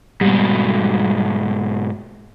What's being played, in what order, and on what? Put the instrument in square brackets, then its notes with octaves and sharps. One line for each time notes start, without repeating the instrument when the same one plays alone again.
[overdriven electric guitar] G#2 B2 [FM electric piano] G3